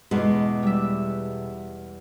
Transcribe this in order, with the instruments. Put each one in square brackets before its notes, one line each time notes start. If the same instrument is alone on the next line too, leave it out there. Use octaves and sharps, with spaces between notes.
[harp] E2 B3 D6 [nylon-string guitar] B2 G#3
[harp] G3 E5